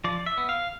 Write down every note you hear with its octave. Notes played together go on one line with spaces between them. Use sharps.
F3 D5
E5
B3
F5